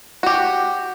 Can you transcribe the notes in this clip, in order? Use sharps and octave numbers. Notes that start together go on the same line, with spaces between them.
F#4 G4